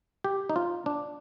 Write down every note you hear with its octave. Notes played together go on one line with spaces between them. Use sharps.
G4
D#4
F4
D4